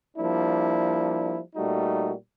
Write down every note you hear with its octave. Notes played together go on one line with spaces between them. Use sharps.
F3 G3 A#3 D4 E4
A#2 G3 A3 D#4 F#4